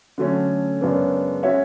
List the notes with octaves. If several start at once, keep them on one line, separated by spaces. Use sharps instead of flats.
D3 F#3 A3 C#4
F#2 C#3 G#3 B3 D4
G#3 C#4 F#4 C#5 E5